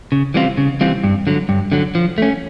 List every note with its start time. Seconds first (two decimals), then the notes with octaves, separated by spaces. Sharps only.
0.12 C#3
0.34 E3 G3 C4 F4
0.57 C#3
0.81 E3 G3 C4 F4
1.04 G2
1.27 D3 F#3
1.49 G2
1.72 D3 F#3
1.95 F3
2.18 A3 C#4